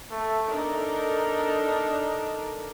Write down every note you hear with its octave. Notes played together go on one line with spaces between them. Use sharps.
A3
D4 D#4 A4 A#4